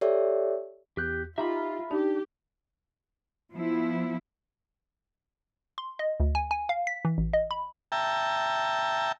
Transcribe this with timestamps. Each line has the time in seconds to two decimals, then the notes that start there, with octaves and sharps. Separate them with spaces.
0.01 G4 A4 C#5 D5 E5
0.97 E2 G4 F#6 G6
1.38 D#4 F4 G4 E5 A#5 B5
1.91 D4 D#4 G4
3.52 F3 B3 E4
5.78 C6
5.99 D#5
6.20 D2
6.35 G#5
6.51 G#5
6.69 F5
6.87 B6
7.05 E3
7.18 A1
7.33 D#5
7.51 B5
7.92 E5 G5 A5 A#5